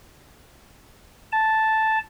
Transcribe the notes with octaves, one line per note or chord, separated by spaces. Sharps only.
A5